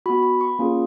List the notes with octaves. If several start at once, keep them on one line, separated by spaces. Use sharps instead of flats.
B3 F#4 B5
B5
C#6
A#3 C#4 F4 G#4